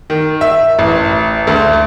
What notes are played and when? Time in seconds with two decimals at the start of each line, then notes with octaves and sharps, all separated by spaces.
0.10 D#3
0.41 E5
0.79 A1
1.47 D2